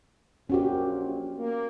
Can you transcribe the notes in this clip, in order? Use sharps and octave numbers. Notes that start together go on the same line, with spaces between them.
A#1 A#2 C#4 F#4 G4
A#3